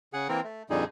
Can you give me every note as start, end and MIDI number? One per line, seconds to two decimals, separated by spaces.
0.13 0.28 49
0.13 0.28 68
0.13 0.28 78
0.29 0.40 52
0.29 0.40 58
0.29 0.40 60
0.29 0.40 70
0.44 0.63 57
0.70 0.84 41
0.70 0.84 46
0.70 0.84 50
0.70 0.84 55
0.70 0.84 63
0.70 0.84 68